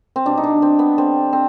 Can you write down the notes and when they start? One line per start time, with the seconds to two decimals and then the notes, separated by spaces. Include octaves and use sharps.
0.16 C4
0.26 B2 G3 D4
0.37 D#4
0.44 D4
0.62 C4
0.79 B3
0.97 D3 G3 C4
1.33 C4